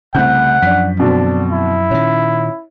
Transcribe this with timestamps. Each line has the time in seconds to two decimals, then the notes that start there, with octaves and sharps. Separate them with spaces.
0.15 C2 C#3 A3 F#5 G6
0.62 F#2 F3 D4 B6
1.00 B2 D3 C4 D4
1.51 E4
1.91 A#2 D#3 C#4